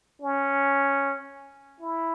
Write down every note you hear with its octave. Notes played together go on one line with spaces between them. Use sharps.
C#4
E4